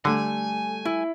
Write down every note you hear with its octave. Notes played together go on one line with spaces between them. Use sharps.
D3 G3 A3 G#5
E4